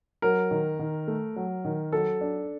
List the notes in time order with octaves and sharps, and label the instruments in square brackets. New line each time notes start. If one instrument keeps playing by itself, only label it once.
[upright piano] F#3 [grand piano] A#4
[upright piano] D#3
D#3
A3
F#3
D#3
[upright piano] F#3 [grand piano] A4
[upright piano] D4